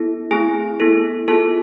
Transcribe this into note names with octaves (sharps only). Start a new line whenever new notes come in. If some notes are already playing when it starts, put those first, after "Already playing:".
Already playing: B3 E4 A4
A3 C4 E4 G#4 G#5
B3 E4 A4
B3 F4 G#4 A4 A5